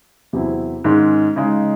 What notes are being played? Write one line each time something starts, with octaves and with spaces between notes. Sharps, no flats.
E2 C3 F#3 C4 E4
G#2 D#3 G#3 C#4
C#3 G#3 D#4